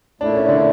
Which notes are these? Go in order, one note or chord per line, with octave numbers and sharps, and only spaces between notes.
A#2 A3 D4 E4
C#4
D3